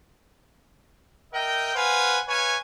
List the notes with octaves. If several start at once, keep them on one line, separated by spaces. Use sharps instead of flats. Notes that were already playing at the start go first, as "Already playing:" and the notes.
A#4 D#5 E5 G5
B4 C5 F5 F#5 G#5
B4 C#5 F5 G#5